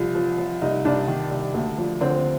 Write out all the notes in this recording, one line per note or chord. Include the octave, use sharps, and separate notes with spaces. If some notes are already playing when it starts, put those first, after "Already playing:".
Already playing: C2 F3
F3
F3
C2 D#4
C2 D4
D#3
C2
D2
F3
D3 C4